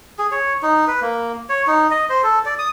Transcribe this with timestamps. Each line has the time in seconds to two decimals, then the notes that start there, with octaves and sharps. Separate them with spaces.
0.19 G#4
0.32 C#5
0.63 D#4
0.87 B4
1.02 A#3
1.49 C#5
1.67 D#4
1.91 D#5
2.09 C5
2.23 A4
2.45 D5
2.59 D#6